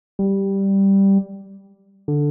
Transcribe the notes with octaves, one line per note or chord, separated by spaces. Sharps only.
G3
D3